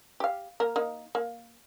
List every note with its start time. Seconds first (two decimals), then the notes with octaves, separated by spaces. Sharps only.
0.20 G4 F5
0.60 A#3 A#4
0.76 A#3 D#4
1.15 A#3